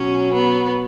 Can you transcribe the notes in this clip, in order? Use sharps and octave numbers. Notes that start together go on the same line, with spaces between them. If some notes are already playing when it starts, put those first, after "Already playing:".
Already playing: B2 F#3 C#4
B3